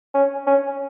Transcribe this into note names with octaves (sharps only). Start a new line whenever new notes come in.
C#4
C#4